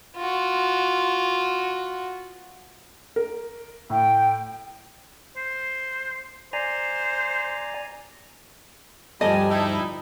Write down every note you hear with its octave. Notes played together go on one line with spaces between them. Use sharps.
F4 F#4
A#4
A2 G5
C5
C5 D5 G#5 A#5
D2 G2 F3 G3 D#5 G#5 A5
G3 D#4 E4